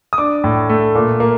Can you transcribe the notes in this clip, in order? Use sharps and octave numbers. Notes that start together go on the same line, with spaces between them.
D#6
D4 D6
A2
A3
A#2
A#3